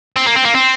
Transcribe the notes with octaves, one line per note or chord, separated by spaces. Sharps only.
C4
A#3
C4
A#3
C4